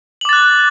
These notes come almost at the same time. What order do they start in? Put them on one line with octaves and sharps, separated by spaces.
F#7 D6 A6 F#6